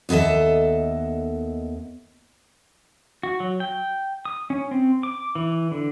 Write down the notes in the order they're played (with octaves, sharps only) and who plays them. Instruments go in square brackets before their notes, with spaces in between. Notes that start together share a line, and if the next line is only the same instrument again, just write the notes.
[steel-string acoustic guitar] D#2 B3 A4 D#5 E5
[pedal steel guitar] F#4
F#3
G5
D#6
C#4
C4
D6
E3
D3